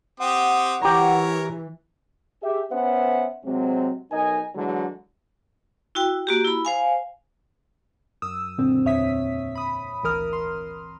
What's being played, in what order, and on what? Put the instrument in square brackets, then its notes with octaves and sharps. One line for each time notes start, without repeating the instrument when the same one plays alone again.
[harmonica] C4 G4 D#6 [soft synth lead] F#5
[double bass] E3 [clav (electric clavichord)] G4 A#5 [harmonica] A#4 C#5
[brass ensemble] G4 G#4 E5
B3 C#4 B4 C5 E5 F#5
C3 F#3 G#3 C4
B1 D#4 A#4 D#5 G#5
D3 E3 F#3 G#3
[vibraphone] E4 F#4 G5
A#3 F#4 G4
E4 B5
C5 F5 G#5
[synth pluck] F#2 D#6 E6
C#2 F#2 A#2 D3 C4
E2 A#2 C#5 E5 D#6 B6
B5 D#6
G#1 D2 E3 A#4 D#6 F6
C6